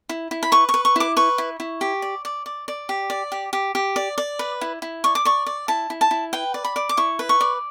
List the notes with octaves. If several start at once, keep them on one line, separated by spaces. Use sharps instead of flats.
E4
E4
B5
B4 C#6
C#6
B4
C#6
E4 D6
B4 C#6
E4
E4
G4
D5
D5
D5
D5
G4
D5
G4
G4
G4
D5
D5
B4
E4
E4
D5 C#6
D6
D5 C#6
D5
E4 A5
E4
A5
E4
B4 G5
D5
B5
D5
D6
E4 C#6
B4
C#6
D5